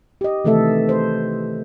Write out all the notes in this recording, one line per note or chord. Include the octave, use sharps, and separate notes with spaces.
G4 D#5
C3 D#3 E3 A3 A4 E5
C5